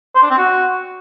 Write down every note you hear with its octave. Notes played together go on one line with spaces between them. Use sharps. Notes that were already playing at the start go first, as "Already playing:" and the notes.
C5
D4
C4
F#4